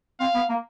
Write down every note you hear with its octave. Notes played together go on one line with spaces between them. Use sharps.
C4 F5
B3
A#3